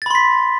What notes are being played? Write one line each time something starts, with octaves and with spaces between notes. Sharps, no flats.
B5 C6 A6 B6